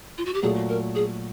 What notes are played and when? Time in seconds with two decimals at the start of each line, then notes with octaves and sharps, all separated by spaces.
0.18 F4
0.25 F#4
0.34 G4
0.42 A#2 F#3 A3 G#4
0.69 A#4
0.95 G#4